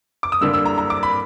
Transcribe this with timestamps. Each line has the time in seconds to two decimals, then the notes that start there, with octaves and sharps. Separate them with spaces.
0.23 D6
0.32 D#6
0.41 G2 D3 G3 A#3 E6
0.54 E6
0.65 A#5
0.78 A#5
0.90 D6
1.03 B5